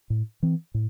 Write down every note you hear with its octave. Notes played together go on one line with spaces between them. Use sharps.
A2
E3 C4
A2